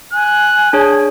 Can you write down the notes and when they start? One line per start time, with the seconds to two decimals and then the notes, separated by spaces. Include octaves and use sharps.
0.13 G#5 F#6
0.73 D4 G#4 C#5